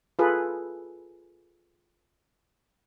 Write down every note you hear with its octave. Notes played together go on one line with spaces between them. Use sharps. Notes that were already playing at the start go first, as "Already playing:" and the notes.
F4 G#4 A4 B4